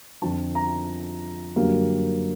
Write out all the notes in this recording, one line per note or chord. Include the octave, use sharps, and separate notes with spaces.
F2 D3 F3 A5
A#5
F#2 D3 G3 A#3